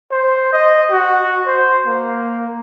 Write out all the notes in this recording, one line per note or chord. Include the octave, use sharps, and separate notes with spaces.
C5
D#5
F#4
C5
A#3